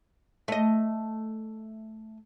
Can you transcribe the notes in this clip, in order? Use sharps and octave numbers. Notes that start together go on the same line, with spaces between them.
A3 D#5